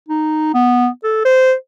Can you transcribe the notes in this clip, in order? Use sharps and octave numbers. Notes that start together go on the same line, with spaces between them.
D#4
B3
A4
C5